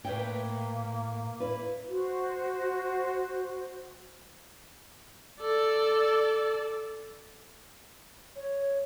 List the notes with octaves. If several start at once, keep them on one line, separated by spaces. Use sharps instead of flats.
A2 A#3 B4 E5 G5
E4 B4
F#4 C5
A4 D5
C#5